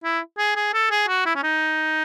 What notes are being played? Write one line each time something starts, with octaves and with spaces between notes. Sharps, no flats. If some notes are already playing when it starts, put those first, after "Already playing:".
E4
G#4
G#4
A4
G#4
F#4
E4
C#4
D#4